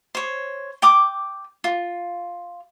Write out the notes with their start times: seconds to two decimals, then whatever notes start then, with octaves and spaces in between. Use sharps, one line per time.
0.15 C5 C#5
0.82 G5 D6 D#6
1.64 F4